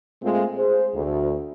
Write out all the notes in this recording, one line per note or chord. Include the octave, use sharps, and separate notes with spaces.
A#2 G#3 A3 C4 F4
G#4 C5
D2